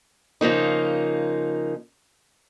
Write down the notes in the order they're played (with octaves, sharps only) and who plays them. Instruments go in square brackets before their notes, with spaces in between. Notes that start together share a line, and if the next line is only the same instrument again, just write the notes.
[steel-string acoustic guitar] C#3 F3 A#3 D#4